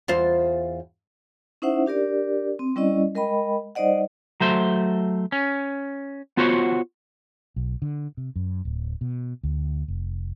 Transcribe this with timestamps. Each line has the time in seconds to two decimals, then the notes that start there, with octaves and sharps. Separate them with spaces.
0.08 E2 F4 C5
1.62 C#4 D#4 E4 C5 E5 F#5
1.86 D4 G4 A#4 D5
2.59 C4
2.76 G3 C#4 E4 D5 D#5
3.15 G#3 A#4 D#5 G5 B5
3.75 G3 D#4 C5 D5 D#5 F#5
4.41 F#3 A3 C5
5.32 C#4
6.37 B3 F4 F#4 C5 C#5
7.56 B1
7.82 D3
8.17 C3
8.36 F#2
8.65 D1
9.01 B2
9.43 D2
9.88 F1